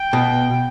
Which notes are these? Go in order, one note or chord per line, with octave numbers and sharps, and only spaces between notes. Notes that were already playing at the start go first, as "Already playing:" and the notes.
Already playing: G5
B2